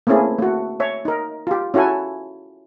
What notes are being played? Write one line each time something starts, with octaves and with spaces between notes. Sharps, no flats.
A3 A#3 C4 C#4 E4 G#4
A3 F#4
C#5 E5
D#4 A#4
F4 G4
C#4 E4 F#4 A4 G#5